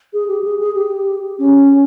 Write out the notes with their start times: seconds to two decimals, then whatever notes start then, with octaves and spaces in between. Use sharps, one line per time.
0.13 G#4
0.28 G4
0.44 G#4
0.60 G#4
0.75 G4
1.39 C#4